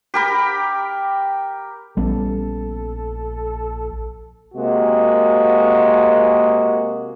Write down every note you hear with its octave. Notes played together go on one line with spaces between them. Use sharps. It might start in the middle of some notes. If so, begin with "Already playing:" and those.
G4 A#4 B5
A#1 G3 B3 C#4 A4
C3 G#3 A#3 F#4